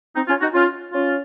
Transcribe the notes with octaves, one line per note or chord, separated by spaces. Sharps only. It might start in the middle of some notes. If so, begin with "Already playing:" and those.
C4 D#4
C#4 F4
D#4 F#4
C#4 F4
C#4 F4